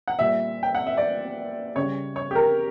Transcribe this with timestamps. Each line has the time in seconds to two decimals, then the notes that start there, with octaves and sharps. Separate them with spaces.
0.08 F#5
0.19 A#2 G3 E5
0.63 G5
0.75 F#5
0.87 E5
0.97 D5
1.76 C#3 G3 C#5
2.16 C#5
2.31 G4
2.35 A#4